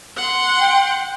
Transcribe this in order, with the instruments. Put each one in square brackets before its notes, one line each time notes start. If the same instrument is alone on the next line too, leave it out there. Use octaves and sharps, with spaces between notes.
[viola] F#5 C6
[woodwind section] G5